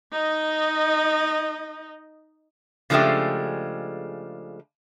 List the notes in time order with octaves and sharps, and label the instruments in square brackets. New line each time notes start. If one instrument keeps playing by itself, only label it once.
[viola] D#4 D#5
[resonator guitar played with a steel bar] C#3 F3 G#3 A3 D4 G4